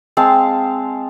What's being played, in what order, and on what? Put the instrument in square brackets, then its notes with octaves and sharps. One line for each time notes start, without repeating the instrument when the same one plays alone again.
[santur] G#3 C4 F5 A5